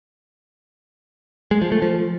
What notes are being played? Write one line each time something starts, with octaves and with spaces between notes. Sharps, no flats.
G#3
F3
A3
F3